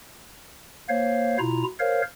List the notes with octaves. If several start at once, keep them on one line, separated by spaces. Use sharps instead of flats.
A#3 C5 C#5 F5
B2 E4 F4 A#5
A#4 C5 C#5 F5